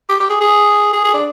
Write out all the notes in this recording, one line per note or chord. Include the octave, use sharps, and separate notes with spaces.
G4
G4
G#4
G#4
G#4
G#4
D4